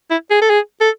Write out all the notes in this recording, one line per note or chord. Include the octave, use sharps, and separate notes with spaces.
E4
G#4
A4
G#4
A4